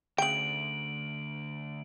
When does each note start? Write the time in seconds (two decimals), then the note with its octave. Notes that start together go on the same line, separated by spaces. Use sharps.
0.18 D2 C#3 G5 D7 F#7